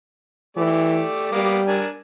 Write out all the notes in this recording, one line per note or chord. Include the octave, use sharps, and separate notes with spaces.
E3 A3 G4 D5
G3 A#3 B3 D6
D4 A#4 G#5